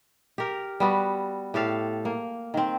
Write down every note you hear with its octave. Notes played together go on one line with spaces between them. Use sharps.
G4 A#4
G3 B3 F#4
A2 G4 A4 F5
A#3
D#3 C4